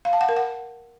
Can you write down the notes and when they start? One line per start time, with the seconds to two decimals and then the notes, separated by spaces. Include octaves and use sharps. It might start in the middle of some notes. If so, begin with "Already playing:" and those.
0.05 F5
0.13 A5
0.21 F#5
0.29 A#4
0.37 F#5